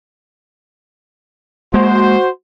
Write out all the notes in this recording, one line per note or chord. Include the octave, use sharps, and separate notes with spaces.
G#3 A#3 F#4 C5